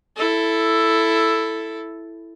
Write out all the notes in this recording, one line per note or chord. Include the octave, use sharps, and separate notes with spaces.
E4 A4